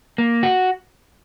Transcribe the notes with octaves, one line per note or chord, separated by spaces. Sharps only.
A#3
F#4